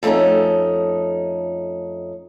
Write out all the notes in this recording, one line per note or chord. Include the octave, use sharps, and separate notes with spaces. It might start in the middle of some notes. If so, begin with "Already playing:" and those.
F2 A3 A#3 C#4 D#4